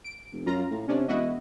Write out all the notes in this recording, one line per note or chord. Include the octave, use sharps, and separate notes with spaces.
D7
F1
F#2 F4 A#5
A2
C3 C#4 D4
E1 E4 F#4 D#5